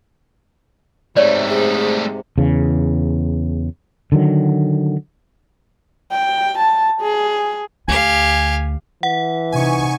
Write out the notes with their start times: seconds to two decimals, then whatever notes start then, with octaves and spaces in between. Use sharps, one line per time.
1.17 G#2 C3 G3 A3 C#5 D5
1.48 G#4
2.38 E2 C#3
4.12 D3 D#3 F#3
6.12 G5
6.59 A5
7.01 G#4
7.88 D2 G4 F5 G#5
9.03 E3 F#5
9.52 C3 D#4 G#5 C#6